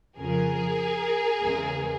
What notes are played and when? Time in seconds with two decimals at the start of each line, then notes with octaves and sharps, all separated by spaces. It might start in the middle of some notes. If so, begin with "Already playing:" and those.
0.19 F2 C#3 F3 G#4 A#4
1.41 E2 C#3 E3 G#3